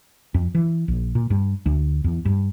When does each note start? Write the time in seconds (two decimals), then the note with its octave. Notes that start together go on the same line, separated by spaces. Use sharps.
0.34 F2
0.55 E3
0.88 A#1
1.15 A#2
1.30 G2
1.66 D2
2.04 E2
2.25 G2